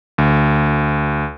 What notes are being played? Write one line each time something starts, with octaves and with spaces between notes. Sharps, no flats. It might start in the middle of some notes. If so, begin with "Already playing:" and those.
D2